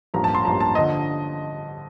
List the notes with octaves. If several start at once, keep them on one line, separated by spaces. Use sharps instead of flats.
A1 G2 F3 A#3 A#5
A5
C6
A1 G2 F3 A#3 A#5
A5
D3 F3 D#5